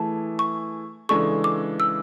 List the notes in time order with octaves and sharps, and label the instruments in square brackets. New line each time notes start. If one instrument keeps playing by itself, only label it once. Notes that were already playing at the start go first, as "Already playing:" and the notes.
Already playing: [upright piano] E3 A3 E4 G#4 [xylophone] A5
[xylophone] C#6
[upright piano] C#3 E3 G#3 D4 A4 [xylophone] C#6
[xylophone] D6
E6